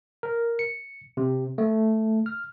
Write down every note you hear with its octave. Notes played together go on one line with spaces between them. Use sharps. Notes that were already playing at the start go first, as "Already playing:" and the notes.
A#4
C#7
C3
A3
F6